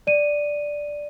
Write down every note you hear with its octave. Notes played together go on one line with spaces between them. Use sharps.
D5 D#7